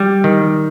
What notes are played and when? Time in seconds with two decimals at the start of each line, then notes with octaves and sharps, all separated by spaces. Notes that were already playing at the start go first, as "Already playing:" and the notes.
Already playing: G3
0.24 D#3